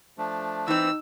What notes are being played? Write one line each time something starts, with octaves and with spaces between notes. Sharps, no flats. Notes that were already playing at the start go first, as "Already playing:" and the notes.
F3 A3 D4
E3 C4 D#4 E6